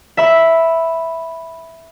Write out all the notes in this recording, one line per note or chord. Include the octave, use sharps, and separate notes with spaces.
E5 B5